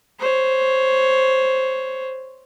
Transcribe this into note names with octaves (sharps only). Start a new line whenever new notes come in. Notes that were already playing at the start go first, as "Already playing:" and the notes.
C5 C#5